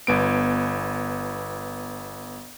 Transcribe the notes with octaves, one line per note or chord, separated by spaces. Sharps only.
G1 B3 D7